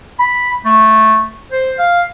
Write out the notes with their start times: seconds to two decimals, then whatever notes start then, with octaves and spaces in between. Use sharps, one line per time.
0.19 B5
0.65 A3
1.51 C5
1.78 F5